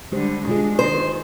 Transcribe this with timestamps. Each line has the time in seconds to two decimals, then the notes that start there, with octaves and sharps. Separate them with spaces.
0.12 D3 G3 G#3 G4 C5
0.47 B2 G#3 D4 F4 G#4
0.79 D#3 C5